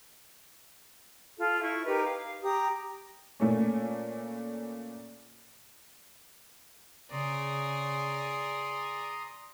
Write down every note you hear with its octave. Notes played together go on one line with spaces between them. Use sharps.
F4 A4
E4 C#6
D#4 G4 A#4 B4
F5
G4 A#5 D#6
A#2 A3 C#4
C#3 G#4 D5 A#5 C6 D#6